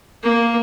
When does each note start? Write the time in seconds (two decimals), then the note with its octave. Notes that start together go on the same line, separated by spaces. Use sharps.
0.23 A#3